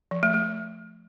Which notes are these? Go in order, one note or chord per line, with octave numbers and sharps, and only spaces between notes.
F3
A3
A3